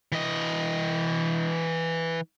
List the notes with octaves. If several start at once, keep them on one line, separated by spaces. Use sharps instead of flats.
E3 D#5